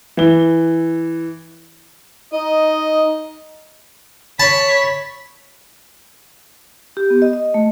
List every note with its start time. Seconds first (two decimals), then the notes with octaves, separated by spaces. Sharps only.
0.17 E3 G7
2.33 D#4 D#5
4.40 C#5 A5 B5 B6
6.97 G4
7.10 B3
7.22 D#5
7.33 D#5
7.54 A3